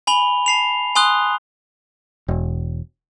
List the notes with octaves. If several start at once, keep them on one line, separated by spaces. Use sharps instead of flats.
G#5 B5 F7 G7
A5 C7 F7
G#5 C6 D#6 F#6 G7
E1